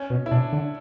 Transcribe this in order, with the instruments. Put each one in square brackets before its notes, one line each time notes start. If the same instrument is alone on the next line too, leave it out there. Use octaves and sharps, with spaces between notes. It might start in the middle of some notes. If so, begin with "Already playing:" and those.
Already playing: [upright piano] C#4
[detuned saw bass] B2
[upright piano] E4
[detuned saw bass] B2 [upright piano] D4
[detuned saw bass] D3